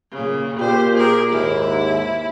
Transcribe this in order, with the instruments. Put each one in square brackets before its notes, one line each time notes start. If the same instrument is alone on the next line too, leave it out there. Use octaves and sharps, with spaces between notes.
[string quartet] A#2 C#3
[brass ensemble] A#2 G4 [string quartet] C5
[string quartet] G#4 A#4
[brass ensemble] D#2 G#2 [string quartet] E4